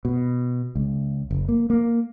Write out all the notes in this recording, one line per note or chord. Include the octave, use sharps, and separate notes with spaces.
B2
C#2
F#1
A#3
A#3